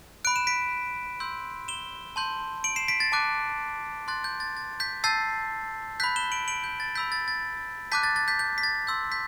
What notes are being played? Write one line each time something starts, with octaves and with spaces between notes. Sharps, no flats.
B5 F#6 D7
E7
B6 D7
C6 E6 G6
E7 G7
A5 C6 G6
D7 F#7
C7 E7
B6 D7
A6
A5 D6 F#6
C6 F#6 A6
G6
A6
A6
G6 B6
A5 E6 G6 A6 C7
B5 F#6 G6 B6
E7 G7
D7 F#7
D7 F#7
G6
A6
B5 E6 G6 B6
A6
A6
A5 D6 F#6 G6 B6
A6
A6
G6 B6
G6
B6
A6
C6 E6 G6
G6 B6